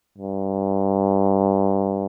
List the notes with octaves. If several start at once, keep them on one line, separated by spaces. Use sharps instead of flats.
G2